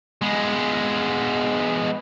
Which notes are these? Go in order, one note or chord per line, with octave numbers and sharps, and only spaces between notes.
G#3 B3